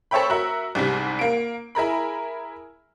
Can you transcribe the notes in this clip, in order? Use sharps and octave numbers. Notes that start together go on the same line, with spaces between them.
A4 C5 C#5 E5 G5 B5
F#4 A#4 E5
C2 G#2 C3 G3
A#3 D7
E4 G#4 A#4 B5